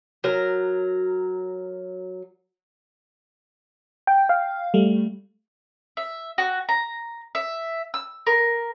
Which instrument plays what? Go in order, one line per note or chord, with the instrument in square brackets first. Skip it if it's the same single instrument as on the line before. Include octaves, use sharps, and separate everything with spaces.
[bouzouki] F#3 A#4
[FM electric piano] G5
F5
G3 A3
[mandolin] E5
F#4
A#5
E5
E6
A#4